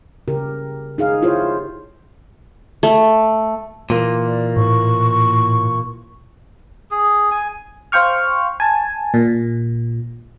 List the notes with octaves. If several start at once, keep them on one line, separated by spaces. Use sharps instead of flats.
C#3 G4 A#4
D#4 G#4 F5
E4 F4 G4 C5 C#5
A3
A#2 E3 A#3
D5
A2 C#6
G#4
G#5
C5 F5 G5 C#6 F6
G#5 A5
A#2